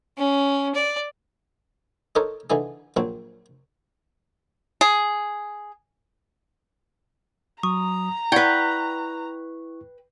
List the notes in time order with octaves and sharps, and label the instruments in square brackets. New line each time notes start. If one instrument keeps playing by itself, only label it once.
[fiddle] C#4
D5
[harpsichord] D#4 A4 A#4 C5 C#5
D3 E3 D#4 G#4
A#1 F#3 C4
[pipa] G#4
[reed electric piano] F#3 D#6 [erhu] A#5 [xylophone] C#6
[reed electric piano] E4 C#6 [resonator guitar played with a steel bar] B4 G5 [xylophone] D5 F#5 G#6